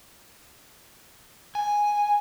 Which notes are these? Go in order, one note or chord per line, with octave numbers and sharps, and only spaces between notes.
G#5